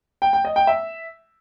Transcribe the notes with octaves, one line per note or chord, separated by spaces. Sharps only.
G5
G5
D#5
G5
E5